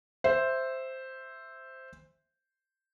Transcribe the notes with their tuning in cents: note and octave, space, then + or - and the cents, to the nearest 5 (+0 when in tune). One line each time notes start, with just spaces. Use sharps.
C5 +0 E5 +0